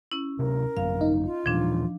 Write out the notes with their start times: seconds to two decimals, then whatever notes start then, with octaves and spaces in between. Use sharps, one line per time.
0.12 C#4 E4
0.39 D1 C3 A#4
0.77 G#1 F#2 F#3 F5
1.01 D#4
1.25 F4
1.46 D#2 A#2 E3 F3 D4